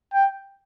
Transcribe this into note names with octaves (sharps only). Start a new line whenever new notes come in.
G5